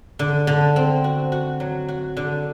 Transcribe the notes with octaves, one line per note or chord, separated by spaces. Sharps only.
D3
D3
C4
F#4
F#4
F#3
F#4
D3